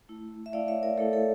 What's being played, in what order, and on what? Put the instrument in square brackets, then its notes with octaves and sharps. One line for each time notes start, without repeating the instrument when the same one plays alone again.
[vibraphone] A3 E4
E5
A3 E4 D5 F5
C#5 E5
A#4 D5
A3 E4 A4 C#5
A4 C#5